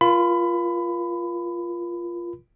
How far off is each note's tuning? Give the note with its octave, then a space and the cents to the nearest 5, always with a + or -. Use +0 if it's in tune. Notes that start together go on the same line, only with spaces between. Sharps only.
F4 -10 A#4 +40 B5 +20